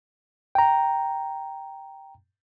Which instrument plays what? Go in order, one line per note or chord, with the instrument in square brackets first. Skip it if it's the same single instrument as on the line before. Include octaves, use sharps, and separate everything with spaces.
[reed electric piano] G5 A#5